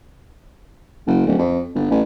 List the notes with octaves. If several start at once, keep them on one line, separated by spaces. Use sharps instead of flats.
F#1
D1
F2
G1
A1